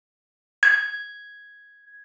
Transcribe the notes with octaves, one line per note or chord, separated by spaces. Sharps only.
G#6